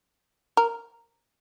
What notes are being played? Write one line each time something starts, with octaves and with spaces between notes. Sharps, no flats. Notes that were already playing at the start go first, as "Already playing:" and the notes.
A#4